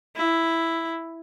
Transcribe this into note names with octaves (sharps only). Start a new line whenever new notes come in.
E4